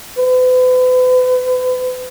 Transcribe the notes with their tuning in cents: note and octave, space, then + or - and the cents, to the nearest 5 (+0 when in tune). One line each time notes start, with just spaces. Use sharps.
B4 +40